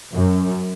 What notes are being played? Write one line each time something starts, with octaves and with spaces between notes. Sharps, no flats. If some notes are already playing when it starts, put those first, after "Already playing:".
F#2